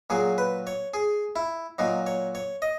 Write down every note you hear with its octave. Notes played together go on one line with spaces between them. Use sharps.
A#2 F#3 G#4
B4
C#5
G#4
E4
A#2 F#3 D#4
C#5
C#5
D#5